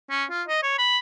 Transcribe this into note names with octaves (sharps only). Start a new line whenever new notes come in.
C#4
F4
D#5
C#5
B5